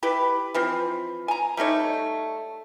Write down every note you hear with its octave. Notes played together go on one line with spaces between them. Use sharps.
E4 G4 B4
E3 F3 C4
G#5 A#5
G3 A3 D#4 C#5